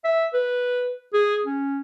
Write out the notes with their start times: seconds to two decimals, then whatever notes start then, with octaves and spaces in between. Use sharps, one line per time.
0.04 E5
0.34 B4
1.14 G#4
1.45 C#4